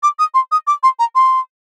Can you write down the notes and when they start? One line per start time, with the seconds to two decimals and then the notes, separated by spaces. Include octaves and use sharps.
0.03 D6
0.19 D#6
0.34 C6
0.52 D#6
0.67 D6
0.83 C6
0.99 A#5
1.15 C6